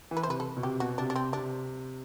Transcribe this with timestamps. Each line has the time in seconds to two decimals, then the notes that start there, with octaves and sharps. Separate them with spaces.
0.11 E3
0.17 B4
0.23 C5
0.27 C3 B4
0.40 A4
0.57 B2
0.63 C3 G4
0.80 B2 F#4
0.98 C3 D4
1.10 D4
1.16 C3 C4
1.33 C3 D4